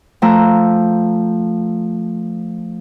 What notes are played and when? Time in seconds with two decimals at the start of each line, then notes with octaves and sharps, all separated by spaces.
0.22 F3 A3 G5 A#5 E6 F#6